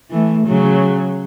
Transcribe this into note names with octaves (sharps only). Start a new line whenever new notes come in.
E3 A3
C#3 F#3